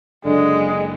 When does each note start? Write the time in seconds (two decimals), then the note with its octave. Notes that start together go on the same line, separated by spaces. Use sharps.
0.25 F#1 F#2 D3 G#3